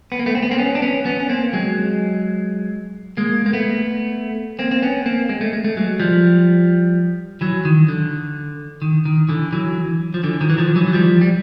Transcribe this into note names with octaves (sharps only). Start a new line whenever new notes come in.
B3
A#3
A3 B3
C4
B3
A#3 C4
B3 C#4
D4
B3 C#4
B3 C#4
C#4
A#3 C4
F#3 G#3
G#3 A#3
A#3
A3 B3
A#3 C4
C4
B3 C#4
A#3 C4
G#3
A3
G#3
A3
F#3 G#3
F3 G3
E3 F#3
D#3
D3
D#3
D#3
D3 E3
E3 F#3
F3
D3 E3
D#3 F3
E3
D#3 F3
E3 F#3
F#3
F3 G3
G3